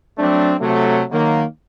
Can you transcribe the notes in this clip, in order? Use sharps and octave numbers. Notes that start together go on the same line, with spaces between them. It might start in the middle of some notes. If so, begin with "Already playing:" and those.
F#3 A3 C4 D4
C3 F#3 A3
D#3 F#3 A#3